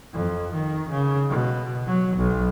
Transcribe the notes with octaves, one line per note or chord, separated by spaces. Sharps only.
F2
D#3
C#3
B2
F#3
B1